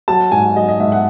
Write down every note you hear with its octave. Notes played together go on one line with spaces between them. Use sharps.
F#3 A5
G#2 G#5
F#3 D#5
D#5
G#2 E5
F#5